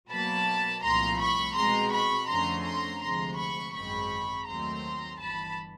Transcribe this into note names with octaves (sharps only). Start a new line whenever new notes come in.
B2 F#3 A#3 A5 B5
C2 A#2 F3 A3 A#5 C6
B5 C#6
B2 G#3 C4 A#5 C6
B5 C#6
F2 D3 F3 A3 C#4 A#5 C6
A#5 C6
D2 C3 F3 G#3 A#5 C6
B5 C#6
G#1 F#2 D#3 G#3 C4 B5 C#6
D#2 D#3 F#3 A3 C4 A#5 C6
G1 G2 E3 A5 B5